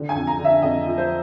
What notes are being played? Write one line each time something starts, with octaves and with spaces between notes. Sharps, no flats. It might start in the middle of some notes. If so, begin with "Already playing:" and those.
Already playing: D3
G#5
F2
A#5
D3
E5
F2 D#5
F3
C5